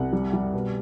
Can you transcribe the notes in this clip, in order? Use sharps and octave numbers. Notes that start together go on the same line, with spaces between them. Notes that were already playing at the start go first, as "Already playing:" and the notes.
Already playing: C2 F#5
G3
G3
B2